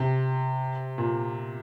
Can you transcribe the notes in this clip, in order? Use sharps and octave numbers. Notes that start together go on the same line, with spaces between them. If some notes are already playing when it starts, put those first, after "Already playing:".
Already playing: C3
A#2